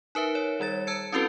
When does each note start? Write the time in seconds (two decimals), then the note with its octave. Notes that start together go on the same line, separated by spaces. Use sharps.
0.15 D#4 A#4 B4 E5
0.35 C#5
0.60 D#3 G3 C#5 A6
0.87 A5 E6 G#6 C#7
1.12 C4 C#4 E4 F#4 A4 B4